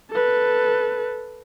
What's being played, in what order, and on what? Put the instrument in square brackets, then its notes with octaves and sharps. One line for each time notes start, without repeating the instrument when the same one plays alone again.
[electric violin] A4 B4